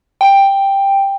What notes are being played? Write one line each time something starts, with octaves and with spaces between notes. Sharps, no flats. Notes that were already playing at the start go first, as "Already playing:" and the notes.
G5